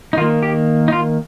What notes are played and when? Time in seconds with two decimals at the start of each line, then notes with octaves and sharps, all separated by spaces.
0.13 D#4
0.17 D#3 F4
0.21 A#3
0.43 G4
0.88 D#4
0.92 F4